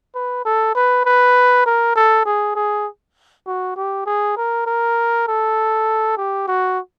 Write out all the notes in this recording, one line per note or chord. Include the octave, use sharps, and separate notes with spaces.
B4
A4
B4
B4
A#4
A4
G#4
G#4
F#4
G4
G#4
A#4
A#4
A4
G4
F#4